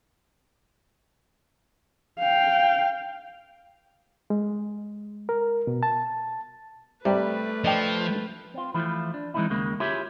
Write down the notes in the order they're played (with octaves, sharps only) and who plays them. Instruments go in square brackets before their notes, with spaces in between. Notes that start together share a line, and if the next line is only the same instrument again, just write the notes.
[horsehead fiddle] F5 G5
[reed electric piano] G#3
A#4
B2
A5
[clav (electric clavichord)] C3 [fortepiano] G3 [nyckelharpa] A3 B4
[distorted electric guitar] F3 [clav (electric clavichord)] D4 D#5 G5
[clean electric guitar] C4 F4
E3 F3 A3 E4 F4
D4
E3 G#3 A#3 C4 D#4 E4
D#2 C#3 G#3 A#3
E4 F4 G4 G#4 C#5 E5